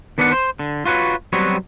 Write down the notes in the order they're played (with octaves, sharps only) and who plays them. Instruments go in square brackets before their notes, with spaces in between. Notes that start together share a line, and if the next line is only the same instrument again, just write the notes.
[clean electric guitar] D#3 B3 D4 D5 D#5 F#5
C5
D3
F4 F#4 B4 C#5
F#3 G3 B3 C4 F#4 C#5